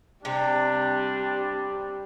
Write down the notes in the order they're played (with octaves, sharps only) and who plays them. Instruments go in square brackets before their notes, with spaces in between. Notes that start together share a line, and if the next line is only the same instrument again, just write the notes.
[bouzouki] C3 [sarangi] G3 [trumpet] D4